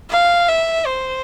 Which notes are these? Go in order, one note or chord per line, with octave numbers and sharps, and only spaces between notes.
F5
E5
C5